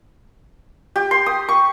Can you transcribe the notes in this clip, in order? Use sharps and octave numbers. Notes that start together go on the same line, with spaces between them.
G4
C6
D#6
C#6